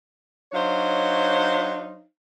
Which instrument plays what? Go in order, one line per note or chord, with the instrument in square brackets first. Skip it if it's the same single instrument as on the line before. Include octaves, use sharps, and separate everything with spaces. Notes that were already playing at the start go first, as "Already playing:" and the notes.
[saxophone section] F#3 D4 D#4 C5 C#5 F5